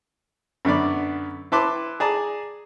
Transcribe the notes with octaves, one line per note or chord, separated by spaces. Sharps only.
F#2 D3 B3 D5
E4 B4 A5 C6 D6
G#4 D5 A5 A#5